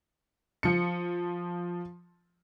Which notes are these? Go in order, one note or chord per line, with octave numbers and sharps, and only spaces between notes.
F3 C#7